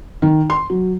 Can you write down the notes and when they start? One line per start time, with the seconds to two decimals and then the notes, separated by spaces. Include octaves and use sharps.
0.22 D#3
0.50 C6
0.70 F#3